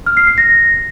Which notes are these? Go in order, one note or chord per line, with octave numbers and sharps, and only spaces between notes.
F6
C7
C7
A#6